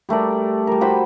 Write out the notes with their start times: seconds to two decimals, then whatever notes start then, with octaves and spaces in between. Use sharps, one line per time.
0.09 G3 A3 A#4 D5
0.67 G3 A#4
0.81 F#4 C5 G5 B5